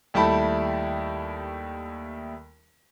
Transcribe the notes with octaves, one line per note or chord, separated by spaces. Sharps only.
D#2 G3 A3 E4 A5 B5